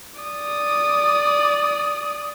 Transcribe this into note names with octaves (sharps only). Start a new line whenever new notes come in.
D5 D#6